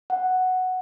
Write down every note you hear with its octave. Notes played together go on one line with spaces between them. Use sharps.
F#5